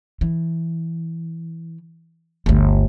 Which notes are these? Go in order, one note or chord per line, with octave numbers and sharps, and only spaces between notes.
E3
G1 D2